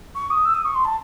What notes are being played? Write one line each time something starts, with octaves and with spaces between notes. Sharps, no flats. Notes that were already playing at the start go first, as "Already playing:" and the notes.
C#6
D#6
E6
D#6
C#6
C6
A5